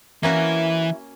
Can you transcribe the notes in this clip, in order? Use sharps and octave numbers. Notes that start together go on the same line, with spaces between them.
E3 A#3 C#4 E4 F#4